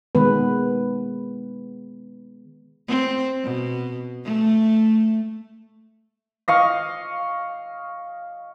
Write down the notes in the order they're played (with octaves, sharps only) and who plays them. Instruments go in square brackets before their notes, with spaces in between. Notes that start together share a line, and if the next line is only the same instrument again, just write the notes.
[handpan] D#3 G#3 B3 B4
[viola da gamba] C4
B2
A3
[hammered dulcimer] D#5 F5 C#6